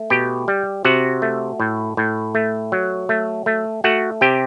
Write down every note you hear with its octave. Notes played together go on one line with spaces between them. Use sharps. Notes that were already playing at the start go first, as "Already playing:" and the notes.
Already playing: A3
B2 G4 G5
G3
C3 F#4 F#5
A3
A2
A2
A3
F#3
A3
A3
A3 F#4 F#5
C3 G4 G5